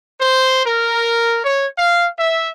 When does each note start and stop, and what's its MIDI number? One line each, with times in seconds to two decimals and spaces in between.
0.20 0.62 72
0.65 1.39 70
1.43 1.66 73
1.78 2.07 77
2.18 2.49 76